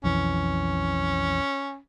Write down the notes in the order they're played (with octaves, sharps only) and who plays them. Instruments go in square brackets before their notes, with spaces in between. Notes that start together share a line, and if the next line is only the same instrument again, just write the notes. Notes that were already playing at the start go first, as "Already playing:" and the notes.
[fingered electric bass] B1 F2 E3 [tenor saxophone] C#4